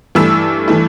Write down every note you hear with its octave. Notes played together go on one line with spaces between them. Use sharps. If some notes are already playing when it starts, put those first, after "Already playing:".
G2 E3 A3 E4 E6
E3 A3 E4